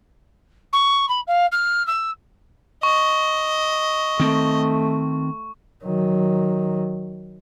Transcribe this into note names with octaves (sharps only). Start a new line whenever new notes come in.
C#6
B5
F5
F6
E6
D#5 C#6
D#3 A3 C4
D#3 F#3